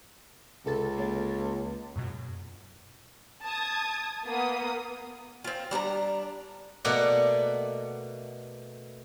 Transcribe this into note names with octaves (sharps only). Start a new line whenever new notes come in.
C#2 C3 A4 A6
A#3 C#5 A6
F#2 B2 F#3
A5 D#6 G#6
A#3 B3 D#6
C4 F4
G3 D4 G#5 A#5
B2 A3 A#3 D5 F#5